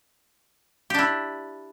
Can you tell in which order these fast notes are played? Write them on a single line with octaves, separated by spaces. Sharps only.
G4 D4 E4